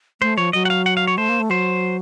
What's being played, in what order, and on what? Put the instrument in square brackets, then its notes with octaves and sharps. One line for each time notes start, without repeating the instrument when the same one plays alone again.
[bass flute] A3 [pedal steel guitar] C5
[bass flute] F3 [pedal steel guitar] C#5
[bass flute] F#3 [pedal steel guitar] D#5
[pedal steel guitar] F#5
F5
F#5
F5
C#5
[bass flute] A3 [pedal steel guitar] C5
[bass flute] A#3
A3
[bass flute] F#3 [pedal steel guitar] C5